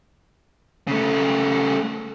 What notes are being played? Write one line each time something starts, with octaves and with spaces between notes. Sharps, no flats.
C#3 A3